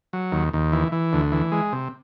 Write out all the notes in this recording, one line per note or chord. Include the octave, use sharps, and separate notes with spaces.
F#3
D#2
D#2
E3
E3
D2
E3
G#3
C3